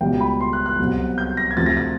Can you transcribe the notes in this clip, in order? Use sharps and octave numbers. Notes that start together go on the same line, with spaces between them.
C#2 B2 G3 G5
B5
C6
F#6
F#6
C2 B2 F#3
G6
A#6
G#6
D2 C3 F3 A6
A#6
A6